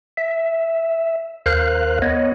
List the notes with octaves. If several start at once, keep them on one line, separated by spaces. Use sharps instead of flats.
E5
D#2 A#4 C5 F5 F#6
B3 C#5 D#5